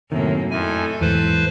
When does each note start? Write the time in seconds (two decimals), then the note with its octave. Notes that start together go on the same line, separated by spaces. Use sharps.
0.12 F#2 A2 C3 D#3 A#3
0.51 F2 A3 E4 A4 G#5
1.01 E2 G#2 E3 B4 C5